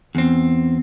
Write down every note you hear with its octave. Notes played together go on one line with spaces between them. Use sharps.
E2 C4